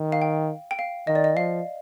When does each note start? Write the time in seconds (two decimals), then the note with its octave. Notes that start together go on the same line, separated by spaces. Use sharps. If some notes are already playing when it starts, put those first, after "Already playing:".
Already playing: D#3
0.12 F5
0.22 G5
0.71 G5
0.79 F5
1.07 D#3 D#5
1.15 D5
1.24 D#5
1.37 F3 F5